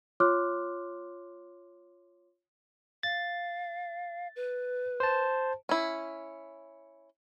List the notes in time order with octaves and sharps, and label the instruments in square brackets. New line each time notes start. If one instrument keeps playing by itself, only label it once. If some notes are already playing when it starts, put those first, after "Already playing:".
[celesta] F4 C#5 C6 D6 F6 F#6
[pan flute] F5 [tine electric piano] A6
[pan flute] B4
[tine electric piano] C5 A5
[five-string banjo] C#4 E4